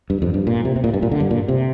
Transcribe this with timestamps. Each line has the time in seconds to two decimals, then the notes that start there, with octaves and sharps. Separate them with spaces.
0.10 G2
0.22 F2
0.34 G2
0.47 A#2
0.65 C3
0.76 C3
0.84 A#2
0.93 G2
1.02 A#2
1.11 D3
1.20 G2
1.31 A#2
1.48 C3